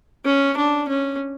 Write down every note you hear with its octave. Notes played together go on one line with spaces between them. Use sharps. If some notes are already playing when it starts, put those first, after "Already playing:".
C#4
D4
C#4